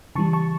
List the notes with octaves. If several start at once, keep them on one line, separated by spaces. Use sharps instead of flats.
C#3 E3 G3 A5 C#6
A5 C#6